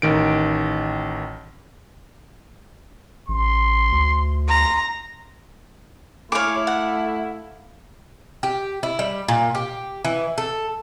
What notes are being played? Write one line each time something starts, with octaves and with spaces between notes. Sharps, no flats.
A1 D#3 D7
A1 C6
D2
A#5 C6
A3 E4 G#4 C#5 F5 D6
F#5
G4
E4
G3
A#2
G4
E3
A4